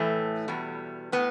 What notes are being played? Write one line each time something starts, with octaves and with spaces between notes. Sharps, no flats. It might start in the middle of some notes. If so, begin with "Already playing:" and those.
Already playing: A2 E3 A3
E2 B2 G3
A2 B3